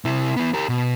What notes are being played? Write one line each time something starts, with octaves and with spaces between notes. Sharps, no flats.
C3 E4
B3 E4
G4 A#4
B2